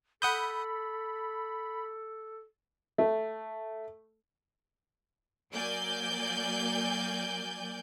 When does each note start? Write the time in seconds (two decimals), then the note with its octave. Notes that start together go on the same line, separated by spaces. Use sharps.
0.22 A4 F#5 B5 D#6 G6
2.98 A3
5.52 F#3 A#3 D5 G#5 G6